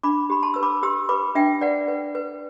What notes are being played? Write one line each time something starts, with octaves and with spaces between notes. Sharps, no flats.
D4 B5 D6
G4 B5
A5 C6
B4 E6
B5 D6
G4 C6 E6
B4 B5 D6
D4 E5 G5
B4 D5 F#5
B4
B4